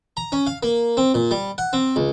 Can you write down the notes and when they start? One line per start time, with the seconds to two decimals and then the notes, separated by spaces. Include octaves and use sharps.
0.17 A#5
0.32 C#4
0.47 F5
0.63 A#3
0.97 C4
1.14 A#2
1.31 G3
1.58 F#5
1.73 C4
1.96 C#2